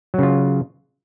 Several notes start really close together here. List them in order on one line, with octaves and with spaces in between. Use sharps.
F#3 C#3 F4